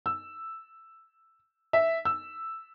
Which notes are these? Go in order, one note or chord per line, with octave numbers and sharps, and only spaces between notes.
E6
E5
E6